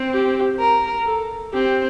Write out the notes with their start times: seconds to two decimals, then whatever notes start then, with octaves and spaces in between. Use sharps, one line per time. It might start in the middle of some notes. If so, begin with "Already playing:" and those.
Already playing: C4
0.13 G4
0.60 A#4
1.07 A4
1.53 C4 G4